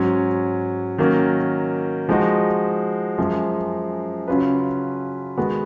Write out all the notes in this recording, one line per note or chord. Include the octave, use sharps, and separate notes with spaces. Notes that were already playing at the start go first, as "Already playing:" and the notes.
Already playing: G#2 F#3 C#4
D#3 F#3 A#3 C#4
F3 G#3 D#4 F#4
F#2 F3 G#3
C#3 F#3 C#4 F4 B4
D#3 G#3 B3 F#4